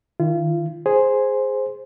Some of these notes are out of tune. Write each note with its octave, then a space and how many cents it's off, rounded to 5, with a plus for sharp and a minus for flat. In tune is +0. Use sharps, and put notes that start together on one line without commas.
D#3 +0 F4 -35
G#4 +0 C5 +0